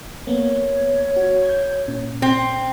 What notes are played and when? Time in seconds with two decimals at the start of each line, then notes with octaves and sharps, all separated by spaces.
0.27 A#3 B3 C#5
1.16 F#4
1.45 G6 G#6
1.88 A#2 C#4
2.22 C4